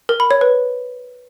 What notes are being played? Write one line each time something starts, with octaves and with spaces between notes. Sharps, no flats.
A#4
B5
C#5
B4